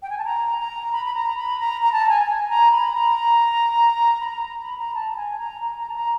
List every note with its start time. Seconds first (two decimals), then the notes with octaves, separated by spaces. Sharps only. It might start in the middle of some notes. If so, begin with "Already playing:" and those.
0.03 G5
0.10 G#5
0.18 A5
0.25 A#5
0.58 A#5
0.93 B5
1.05 B5
1.15 A#5
1.36 B5
1.60 A#5
1.82 A#5
1.92 A5
2.09 G#5
2.26 G#5
2.49 A#5
2.71 B5
2.94 A#5
4.21 B5
4.28 A#5
4.61 B5
4.78 A#5
4.95 A5
5.10 A5
5.16 G#5
5.38 A#5
5.62 A#5
5.78 A#5
5.90 A5
5.94 A#5